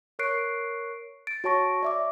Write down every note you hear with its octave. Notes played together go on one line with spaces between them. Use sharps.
A#4 C#5 C#6 F#6 C7 D7
A6 D7
F#4 C#5 A5 C#6 A#6
D5 E5 D6